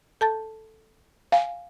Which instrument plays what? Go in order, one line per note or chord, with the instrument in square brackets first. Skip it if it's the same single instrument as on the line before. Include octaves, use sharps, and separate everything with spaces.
[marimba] A4 A5 A6
[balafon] F5 [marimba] G#5